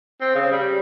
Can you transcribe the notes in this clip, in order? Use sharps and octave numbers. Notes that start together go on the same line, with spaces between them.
C4
C#3
G3